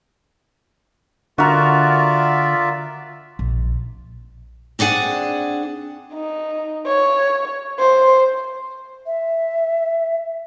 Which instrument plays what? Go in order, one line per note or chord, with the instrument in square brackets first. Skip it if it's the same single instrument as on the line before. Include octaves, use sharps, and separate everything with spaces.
[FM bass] D3 [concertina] F4 D5 E5 [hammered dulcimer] F#4 A#4
[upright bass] A#1
[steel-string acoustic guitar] C4 D4 G#4 F#5
[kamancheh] D#4
C#5
C5
[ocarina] E5